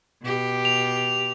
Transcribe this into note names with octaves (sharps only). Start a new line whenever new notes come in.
B2 G4
F7